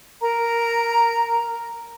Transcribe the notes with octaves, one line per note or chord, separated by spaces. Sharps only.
A#4 A#5